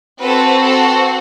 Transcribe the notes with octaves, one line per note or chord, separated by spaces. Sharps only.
C4 F#4 A4 B4
A4